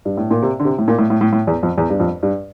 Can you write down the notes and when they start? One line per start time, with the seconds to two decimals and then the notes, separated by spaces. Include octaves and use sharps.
0.05 G2
0.17 A2
0.30 A#2
0.43 C3
0.60 D3
0.65 C3
0.79 A2
0.88 A#2
0.99 A2
1.10 A2
1.21 A2
1.33 A2
1.47 E2
1.63 F2
1.78 E2
1.90 G2
2.00 F2
2.23 G2